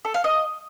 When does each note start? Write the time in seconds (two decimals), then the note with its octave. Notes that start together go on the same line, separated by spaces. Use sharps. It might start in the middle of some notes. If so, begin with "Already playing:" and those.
0.05 A4
0.14 F5
0.24 D#5